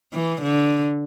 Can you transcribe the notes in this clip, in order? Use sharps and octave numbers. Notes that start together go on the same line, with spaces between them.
E3
D3